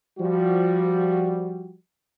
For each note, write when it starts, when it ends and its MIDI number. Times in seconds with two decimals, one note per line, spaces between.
0.19 1.76 53
0.19 1.76 55
0.19 1.76 66